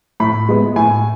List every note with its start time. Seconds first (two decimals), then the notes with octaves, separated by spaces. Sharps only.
0.20 A2 B5
0.49 G#3 B3
0.76 A2 G#5